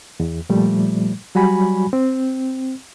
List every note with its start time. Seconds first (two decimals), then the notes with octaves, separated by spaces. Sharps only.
0.20 E2
0.49 A#2 F3 G3 A3
1.35 F#3 G3 F#4 G#5 B5
1.93 C4